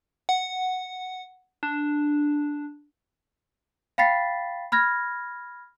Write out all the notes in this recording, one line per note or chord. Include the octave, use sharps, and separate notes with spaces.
F#5
D4
F5 G5 B5 A6 B6 C7
B5 F6 G#6 A#6